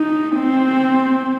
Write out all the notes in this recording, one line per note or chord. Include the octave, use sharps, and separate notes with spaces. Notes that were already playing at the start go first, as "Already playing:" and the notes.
Already playing: D#4
C4